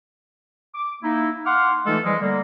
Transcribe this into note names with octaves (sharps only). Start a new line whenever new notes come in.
D6
A#3 D#4 E4
F5 F#5 C6 D6 F6
E3 G#3 A3 D#4 F4 A4
E3 F3 G3 G#3
D3 G3 A#3